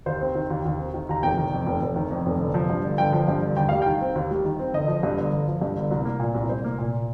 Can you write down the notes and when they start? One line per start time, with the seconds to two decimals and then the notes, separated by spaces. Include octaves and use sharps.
0.06 D#2 C5
0.21 C4
0.35 D#3
0.50 D#2
0.65 D#2
0.80 C4
0.94 D#3
1.09 D#2 A#5
1.23 F1 G5
1.38 D#3
1.53 F2
1.66 F1
1.82 F1
1.96 D#3
2.11 F2
2.26 F1
2.40 G1
2.54 F3
2.70 G2
2.84 G1
2.98 G1 G5
3.13 F3
3.28 G2
3.42 G1
3.57 D#2 G5
3.69 G3 F5
3.82 D#3 G5
4.01 C4
4.15 D#2
4.31 G3
4.45 D#3
4.59 C4
4.73 G1 D#5
4.88 F3
5.03 G2
5.17 G1
5.32 G1
5.47 F3
5.61 G2
5.77 G1
5.91 C2
6.05 A#3
6.20 A#2
6.35 C2
6.49 C2 C5
6.64 A#3
6.78 A#2